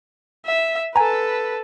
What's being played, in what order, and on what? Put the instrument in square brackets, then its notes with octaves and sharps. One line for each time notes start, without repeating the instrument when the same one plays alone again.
[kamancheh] E5
[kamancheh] A4 B4 [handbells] G#5 A#5